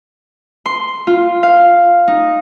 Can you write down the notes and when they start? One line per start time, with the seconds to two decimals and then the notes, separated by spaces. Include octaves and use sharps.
0.66 C6
1.07 F4
1.43 F5
2.08 D#4